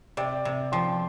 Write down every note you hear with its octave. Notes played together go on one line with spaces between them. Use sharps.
C3 D5 G5
C3
F3 G5 C6